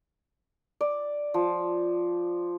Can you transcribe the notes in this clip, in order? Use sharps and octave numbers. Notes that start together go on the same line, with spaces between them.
D5
F3